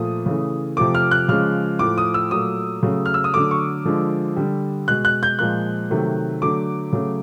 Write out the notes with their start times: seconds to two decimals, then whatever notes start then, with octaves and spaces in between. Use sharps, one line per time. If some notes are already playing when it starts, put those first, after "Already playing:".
Already playing: A#2 F3 A3 D#6
0.26 C#3 E3 A3
0.77 C3 F3 A3 D6
0.95 F6
1.11 F#6
1.28 C#3 F3 G#3 F6
1.79 A2 F3 A3 D6
1.98 D#6
2.14 E6
2.31 A#2 F#3 A3 D#6
2.83 C#3 F#3 A3
3.06 F6
3.14 E6
3.24 D#6
3.34 D3 F#3 A3 D6
3.51 C#6
3.85 D3 F3 G#3
4.36 D3 G3
4.88 B2 G#3 F#6
5.05 F#6
5.23 G6
5.39 A#2 F3 G#3 F#6
5.91 C3 D#3 F#3 A3
6.42 D3 F#3 A3 D6
6.93 C#3 F#3 A3